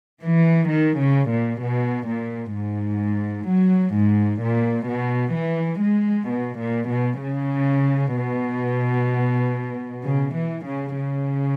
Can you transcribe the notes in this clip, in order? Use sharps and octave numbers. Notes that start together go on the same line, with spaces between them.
E3
D#3
C#3
A#2
B2
A#2
G#2
F#3
G#2
A#2
B2
E3
G#3
B2
A#2
B2
C#3
B2
C#3
E3
C#3
C#3